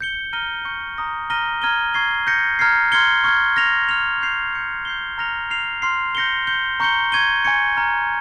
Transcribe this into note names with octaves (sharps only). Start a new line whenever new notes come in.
G6 C#7 G7
A#5 F6 A#6 D#7 G7
C#6 G6 C#7
A#5 D#6 A#6
A#5 F6 A#6 D#7 G7
A#5 F6 G#6 D#7 G7
C#6 G#6 C7 G7
G6 A#6 C#7
A#5 F6 G#6 C7
C6 F6 G#6 C#7 G7
C#6 F6 G#6
F6 A#6 F7
F6 A#6 C#7 F7
C#6 G6 C7 F7
C#6 G6 C#7 F7
G6 C7 G7
A#5 F6 A#6 C#7 F7
F6 C7 F7
C6 F6 C7
G6 A#6 C#7 G7
G6 C#7 G7
A#5 C#6 G6 C#7 G7
C#6 G#6 D#7 G7
G#5 C#6 G#6 C#7
A#5 C#6 F6